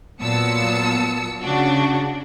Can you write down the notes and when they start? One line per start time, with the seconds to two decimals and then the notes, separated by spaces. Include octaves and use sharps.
0.21 A#2 F#3 B3 A5 E6 C#7
1.42 C#3 D4 F#4